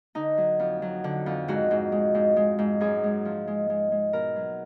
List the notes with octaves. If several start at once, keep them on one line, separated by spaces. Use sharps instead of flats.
D3 D#4
F#3
F2
F#3
D3
F2
G#2 F#4
G#2
G#3
G#2
G#3
G#2
F#2 G#4
G#3
F3
G#3
G#3
G#3
B2 A#4
F#3